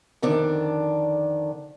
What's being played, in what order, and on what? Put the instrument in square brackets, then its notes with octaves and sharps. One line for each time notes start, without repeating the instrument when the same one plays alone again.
[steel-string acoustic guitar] F2 D3 D#3 D4